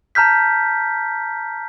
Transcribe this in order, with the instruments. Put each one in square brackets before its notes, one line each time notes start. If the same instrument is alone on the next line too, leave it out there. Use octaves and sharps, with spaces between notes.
[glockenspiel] A5 A#5 F6 G6 B6